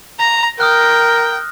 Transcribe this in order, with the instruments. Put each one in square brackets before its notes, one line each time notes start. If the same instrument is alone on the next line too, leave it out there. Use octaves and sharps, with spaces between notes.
[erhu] A#5 [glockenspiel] A#6
[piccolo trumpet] A#4 [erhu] G5 [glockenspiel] D#6 F6 F#6